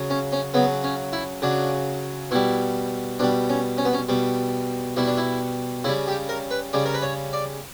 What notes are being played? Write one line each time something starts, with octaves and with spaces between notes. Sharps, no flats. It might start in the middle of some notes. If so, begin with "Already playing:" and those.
Already playing: C#3 F#3
C#4
C#4
C#3 F#3 B3
C#4
E4
C#3 F#3 D4
B2 G3 E4
B2 G3 D4
C#4
C#4
B3
C#4
B2 G3
B2 G3 E4
D4
E4
C#3 G3 E4
G4
A#4
B4
C#3 G3 D5
A#4
B4
C#5
D5